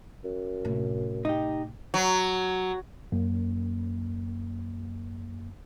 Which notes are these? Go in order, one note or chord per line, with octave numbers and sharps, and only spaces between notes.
F#2
A2 C3
D#4 G4
F#3
F#2 A#3